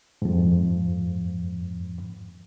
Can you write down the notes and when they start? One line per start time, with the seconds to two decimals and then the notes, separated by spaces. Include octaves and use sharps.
0.22 F2 G#2